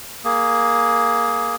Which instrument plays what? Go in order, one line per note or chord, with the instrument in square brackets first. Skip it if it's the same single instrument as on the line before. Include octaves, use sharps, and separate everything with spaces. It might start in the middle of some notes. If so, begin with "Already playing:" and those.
[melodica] A#3 G#4